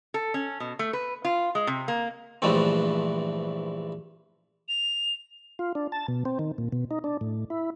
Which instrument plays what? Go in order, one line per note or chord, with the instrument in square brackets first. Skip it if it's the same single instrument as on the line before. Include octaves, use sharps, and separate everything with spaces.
[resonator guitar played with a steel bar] A4
C#4
B2
A3
B4
F4
G#3
C3
A#3
[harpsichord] A#1 G2 E3 A3 C4
[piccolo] F7
[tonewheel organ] F4
D4
A5
B2
C4
D#3
A#2
B2
D#4
D4
A2
E4